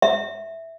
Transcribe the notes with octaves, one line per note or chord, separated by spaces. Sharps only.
E5